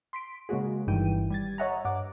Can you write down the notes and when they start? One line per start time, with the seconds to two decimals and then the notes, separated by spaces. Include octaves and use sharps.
0.13 C6 B6 D7
0.49 C#3 G#3 A#3 C#4 F#4 G#4
0.87 G1 G2 D#3 E3 G5 D#7
1.30 G3 G#6 A6
1.58 C#5 D#5 E5 F#5 G#5 A#5
1.85 G2 F#5 D6